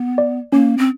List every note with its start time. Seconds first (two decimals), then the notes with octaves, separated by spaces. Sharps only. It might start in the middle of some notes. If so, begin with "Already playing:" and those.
Already playing: B3
0.18 D5
0.52 A#3 C#4
0.78 C4